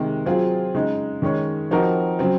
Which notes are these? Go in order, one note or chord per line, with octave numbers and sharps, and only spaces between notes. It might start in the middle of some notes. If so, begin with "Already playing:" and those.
Already playing: C3 D#3 G#3
F#3 C4 F4 G#4
C#3 G#3 D#4
D#3 G#3 C#4 G#4 C#5
F3 C4 D#4 F#4 A#4
C#3 F#3 C4